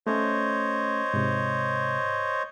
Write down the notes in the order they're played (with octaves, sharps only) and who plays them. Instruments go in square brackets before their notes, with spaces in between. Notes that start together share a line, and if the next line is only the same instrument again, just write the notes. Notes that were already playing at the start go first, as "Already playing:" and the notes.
[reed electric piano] A3 C#4 [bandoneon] C5 C#5 D#5
[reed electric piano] G#2 C3